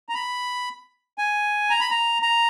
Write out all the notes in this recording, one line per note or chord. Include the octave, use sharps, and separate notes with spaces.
A#5
B5
G#5
A#5
B5
A#5
A#5